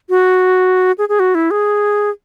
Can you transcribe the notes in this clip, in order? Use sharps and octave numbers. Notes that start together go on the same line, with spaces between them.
F#4
G#4
G#4
F#4
E4
G#4